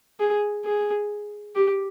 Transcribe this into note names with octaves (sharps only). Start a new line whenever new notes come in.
G#4
G#4
G4